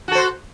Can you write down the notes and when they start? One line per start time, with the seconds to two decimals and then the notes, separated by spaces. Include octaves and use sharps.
0.08 F#4
0.12 A4
0.15 C5